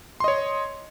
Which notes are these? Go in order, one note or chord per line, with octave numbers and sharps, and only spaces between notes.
C#5 D#5 C6